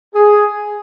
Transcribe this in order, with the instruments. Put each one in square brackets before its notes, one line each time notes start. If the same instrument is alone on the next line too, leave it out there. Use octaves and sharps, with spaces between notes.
[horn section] G#4